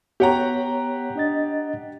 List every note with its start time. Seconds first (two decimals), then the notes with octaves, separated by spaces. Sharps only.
0.20 B3 G4 C#5 F#5 A#5
1.16 D4 D#5 A6